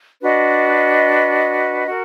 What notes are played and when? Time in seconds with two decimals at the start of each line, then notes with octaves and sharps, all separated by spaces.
0.21 D4 F#4 B4 D#5
1.87 F#4 A#4